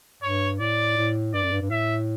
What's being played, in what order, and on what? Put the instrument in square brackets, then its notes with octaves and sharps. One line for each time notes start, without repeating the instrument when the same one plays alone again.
[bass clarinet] G2 [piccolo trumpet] C#5
[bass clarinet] A2 [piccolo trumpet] D5
[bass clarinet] A2
[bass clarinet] G2 [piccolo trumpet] D5
[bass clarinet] F#2
G2
G2
[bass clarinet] A2 [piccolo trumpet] E5